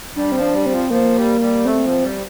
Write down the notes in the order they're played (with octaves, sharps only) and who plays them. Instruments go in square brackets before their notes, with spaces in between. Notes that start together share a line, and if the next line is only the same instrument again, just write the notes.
[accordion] G3 [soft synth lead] D4
[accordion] F3 [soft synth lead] C4
[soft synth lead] D4
[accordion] G3
[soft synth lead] C4
[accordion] F3
[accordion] F3 [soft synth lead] A#3
[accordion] G3
G3
[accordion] A3 [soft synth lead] C4
[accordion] F3
G3